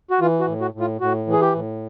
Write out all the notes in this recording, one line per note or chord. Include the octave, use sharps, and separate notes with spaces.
F#4
E3 F4
F#4
A2
F#4
A2
F4
A2 F#4
E3
G#4
G4
A2